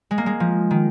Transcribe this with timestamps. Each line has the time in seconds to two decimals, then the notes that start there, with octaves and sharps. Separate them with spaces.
0.11 G#3
0.18 A#3
0.26 G#3
0.40 F3
0.71 D#3